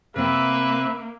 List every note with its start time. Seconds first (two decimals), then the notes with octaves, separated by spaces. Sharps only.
0.16 C3 A#3 C4 B4 E5 G5